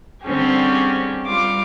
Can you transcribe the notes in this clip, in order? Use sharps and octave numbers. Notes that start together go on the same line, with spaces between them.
D3 G3 C4 C#4 G4 G#4
G3 F4 D6